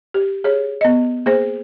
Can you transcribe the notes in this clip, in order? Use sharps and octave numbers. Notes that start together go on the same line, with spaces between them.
G4
G#4 C#5
B3 D#5
A#3 G#4 C5